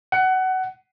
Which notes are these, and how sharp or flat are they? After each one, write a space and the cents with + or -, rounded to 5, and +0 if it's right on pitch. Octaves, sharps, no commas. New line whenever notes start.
F#5 +20